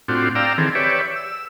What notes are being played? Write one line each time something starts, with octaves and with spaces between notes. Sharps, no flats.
A2 C4 D4 F4 F#4
D5 F5 G5 A#5 E6
D#3 E3 C4 G#4 A4
G4 B4 C#5 D5 E5
E6